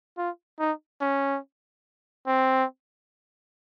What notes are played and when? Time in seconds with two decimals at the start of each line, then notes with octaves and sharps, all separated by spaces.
0.17 F4
0.59 D#4
1.01 C#4
2.27 C4